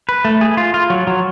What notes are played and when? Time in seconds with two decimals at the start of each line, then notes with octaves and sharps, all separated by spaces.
0.09 B4
0.25 A3
0.41 G#4
0.57 F4
0.74 F4
0.90 F#3
1.07 F#3